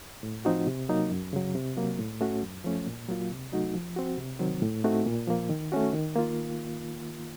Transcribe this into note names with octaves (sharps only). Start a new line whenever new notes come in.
A2
F3 C4 D#4 F#4
C3
F#3 A#3 D#4
F#2
C#3 F#3
C3
F#3 A#3
A2
A3 C#4 F#4
F#2
F3 A3 C#4
A#2
F#3 A#3 F4
C3
F#3 A3 D#4 F#4
F3
C4 F#4
C3
D#3 F#3 C4
A2
A3 C4 D#4 F#4
A#2
F3 A#3
D#3
A3 C#4 F#4
D#3
A#3 F4